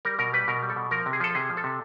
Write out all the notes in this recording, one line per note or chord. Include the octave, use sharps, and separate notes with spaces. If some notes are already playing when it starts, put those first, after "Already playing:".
G3 A#4
B2 A#4
G3 B4
B2 A#4
G3
A4
B2
F3 A#4
C3
G#4
F3 A4
C3 G#4
F3
A4
C3